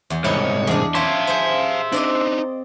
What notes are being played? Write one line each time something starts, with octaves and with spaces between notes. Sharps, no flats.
E2
C2 G#2 D#4 E4 C#5
E2 D4 G#4
F4 C#5 E5 F5 A5 C6
G#4 C5
C4 D4 D#4 D5 D#5